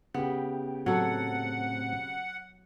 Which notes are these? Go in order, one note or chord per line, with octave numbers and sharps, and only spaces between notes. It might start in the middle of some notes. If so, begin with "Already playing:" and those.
C#3 B3 G4 G5
A2 F#3 C4 A4 F#5